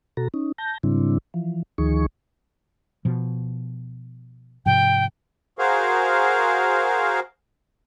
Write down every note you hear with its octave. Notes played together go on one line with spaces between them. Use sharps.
B2 F#4 A4 A#5
C#4 D#4
A5 G6 A#6
G#2 C#3 G3 C4 D4 E4
E3 F3
D2 D#3 F3 D#4 G#4 C#6
B2 F3
G#2 C3 F3 G5
F#4 G#4 A#4 C5 F5